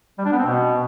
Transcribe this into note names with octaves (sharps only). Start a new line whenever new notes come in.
G3
D4
B3
C4
B2